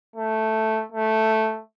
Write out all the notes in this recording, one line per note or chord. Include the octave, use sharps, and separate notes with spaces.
A3
A3